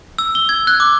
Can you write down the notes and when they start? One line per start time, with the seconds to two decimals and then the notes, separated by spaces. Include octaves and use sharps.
0.19 E6
0.35 G7
0.49 G#6
0.67 F#6
0.80 D6